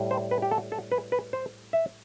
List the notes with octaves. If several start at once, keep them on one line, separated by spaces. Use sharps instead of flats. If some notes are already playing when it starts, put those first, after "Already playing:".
Already playing: A2 G3
C5
B4
G4
A4
A4
B4
B4
C5
E5